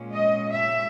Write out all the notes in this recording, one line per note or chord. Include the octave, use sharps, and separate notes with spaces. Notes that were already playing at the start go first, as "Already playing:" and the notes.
Already playing: A#2 G#3 C#4
D#5
E5